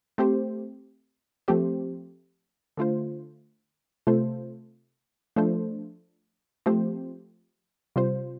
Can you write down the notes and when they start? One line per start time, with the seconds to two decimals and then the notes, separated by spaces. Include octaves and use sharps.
0.18 A3 C4 G4 C5
1.48 F3 A3 C4 G4 C5
2.77 D3 A3 F4 C5
4.07 C3 A3 F4 A4 C5
5.36 F3 A3 D4 A4 C5
6.66 F3 A3 C4 G4 C5
7.96 C3 G3 F4 C5